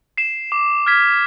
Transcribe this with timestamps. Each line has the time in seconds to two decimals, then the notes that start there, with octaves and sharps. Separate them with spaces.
0.18 C7 E7
0.52 D6
0.86 F6 G#6 B6